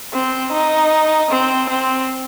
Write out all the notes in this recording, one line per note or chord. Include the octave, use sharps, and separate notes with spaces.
C4
D#4
C4
C4